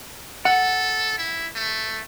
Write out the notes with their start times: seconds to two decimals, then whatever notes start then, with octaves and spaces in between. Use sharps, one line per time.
0.45 A4 F#5
1.18 E4
1.55 A3